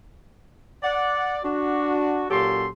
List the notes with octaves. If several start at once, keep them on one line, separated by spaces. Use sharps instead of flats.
D5 F#5
D4 F#4
A#2 F#3 C#4 G4 A4 C6